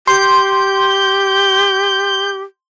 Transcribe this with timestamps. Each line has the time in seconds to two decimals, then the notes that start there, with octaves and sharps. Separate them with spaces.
0.07 G4 C6 G6